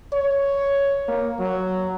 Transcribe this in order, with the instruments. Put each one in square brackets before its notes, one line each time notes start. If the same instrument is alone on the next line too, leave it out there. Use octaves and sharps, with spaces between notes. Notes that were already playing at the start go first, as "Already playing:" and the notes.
[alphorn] C#5
A#3
F#3